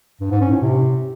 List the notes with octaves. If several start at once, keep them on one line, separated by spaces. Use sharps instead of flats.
G2
G#2
C#4
A2
C3